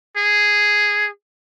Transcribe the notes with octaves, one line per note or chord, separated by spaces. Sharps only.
G#4